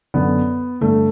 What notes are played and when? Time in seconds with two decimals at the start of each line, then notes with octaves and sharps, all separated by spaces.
0.14 F#2 D3 B3
0.81 G2 D3 A3